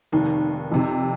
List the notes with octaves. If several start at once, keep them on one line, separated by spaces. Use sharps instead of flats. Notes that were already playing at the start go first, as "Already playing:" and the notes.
F1 D#2 D#3
F2 C3 D#3